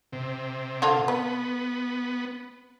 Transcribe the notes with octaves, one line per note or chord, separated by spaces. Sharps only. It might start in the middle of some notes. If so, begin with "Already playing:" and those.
C3
D3 A#3 F4
B3 B4